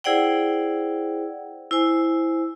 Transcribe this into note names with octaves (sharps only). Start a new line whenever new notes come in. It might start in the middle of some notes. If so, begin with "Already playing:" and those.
E4 G#4 C5 D5 F#5 G5
E4 C5 G#5